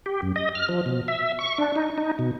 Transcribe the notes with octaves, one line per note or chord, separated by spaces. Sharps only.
G4
F#2
D#5
F6
F3
B2
E5
C#6
D4
D#4
D#4
B2